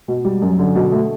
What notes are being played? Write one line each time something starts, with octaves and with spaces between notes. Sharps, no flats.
B2
G3
F#2
D3
B2
A3